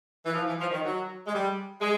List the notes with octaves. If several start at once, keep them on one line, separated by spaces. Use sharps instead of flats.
E3
F3
E3
F3
D#3
F#3
G#3
G3
G#3